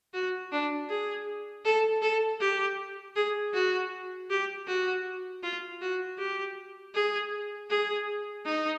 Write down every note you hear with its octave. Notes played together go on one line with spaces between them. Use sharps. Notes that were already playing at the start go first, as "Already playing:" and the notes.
F#4
D4
G#4
A4
A4
G4
G#4
F#4
G4
F#4
F4
F#4
G4
G#4
G#4
D#4